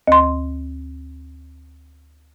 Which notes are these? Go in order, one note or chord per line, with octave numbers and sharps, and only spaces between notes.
D2 C6